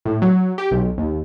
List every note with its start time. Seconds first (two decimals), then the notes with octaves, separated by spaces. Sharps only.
0.05 A2
0.22 F#3
0.58 G4
0.71 B1
0.98 D#2